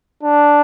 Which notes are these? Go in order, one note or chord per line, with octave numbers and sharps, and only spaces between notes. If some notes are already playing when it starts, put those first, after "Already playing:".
D4